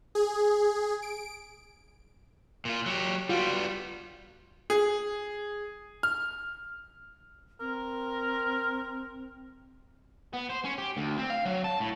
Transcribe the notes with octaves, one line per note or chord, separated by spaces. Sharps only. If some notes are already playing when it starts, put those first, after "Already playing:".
G#4
D7
A#2 F4
F#3 G4
G3 B3 F4 F#4
G#4
F6
C4 A#4
B3
C5
C#4
G4
D2
C4
F5
F#3
A5
A2